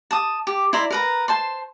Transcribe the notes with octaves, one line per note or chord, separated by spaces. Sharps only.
A5 D#6
G4
E4 D5 A#5 C6
A#4 B4 A#5
C5 A5 C6